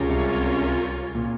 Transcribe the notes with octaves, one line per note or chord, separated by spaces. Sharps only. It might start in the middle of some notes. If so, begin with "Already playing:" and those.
Already playing: C#2 C#3 G3 C#4 F4 A#4 C#5
C2 C3
A#2